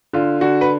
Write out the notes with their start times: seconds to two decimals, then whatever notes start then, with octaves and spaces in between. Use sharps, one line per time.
0.13 D3 F4
0.41 D3 F#4
0.61 B4